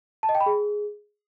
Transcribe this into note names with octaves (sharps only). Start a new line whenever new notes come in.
A5
D#5
G5
B5
G#4